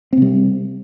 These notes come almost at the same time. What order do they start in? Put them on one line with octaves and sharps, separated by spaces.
C4 C3 G3